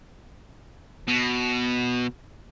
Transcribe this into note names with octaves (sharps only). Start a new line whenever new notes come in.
B2